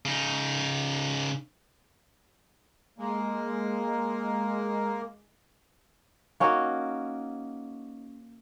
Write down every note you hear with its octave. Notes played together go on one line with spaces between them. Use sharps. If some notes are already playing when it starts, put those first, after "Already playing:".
C#3 D#4
G#3 A#3
A#3 C#4 D#4 F#4